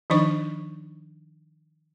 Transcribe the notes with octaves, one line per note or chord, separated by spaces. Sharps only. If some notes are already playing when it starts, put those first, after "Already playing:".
D#3 F3 D4 D#4 C5 C#6